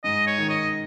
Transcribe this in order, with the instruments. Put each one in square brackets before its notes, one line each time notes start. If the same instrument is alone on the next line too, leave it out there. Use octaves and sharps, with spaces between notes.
[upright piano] G#2 [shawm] D#5
[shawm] C#5
[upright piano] D#3
[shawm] D#5